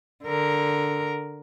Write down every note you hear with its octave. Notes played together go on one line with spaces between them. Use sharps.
D3 A#4